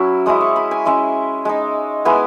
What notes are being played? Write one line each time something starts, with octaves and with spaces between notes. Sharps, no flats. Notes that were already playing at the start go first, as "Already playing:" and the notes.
Already playing: F#3 C#4 E4
G#3 C#4 E4 D#6
C#6
B5
G#5
G#3 C#4 E4 E5
G#3 D#4
G#3 B3 E4 G#5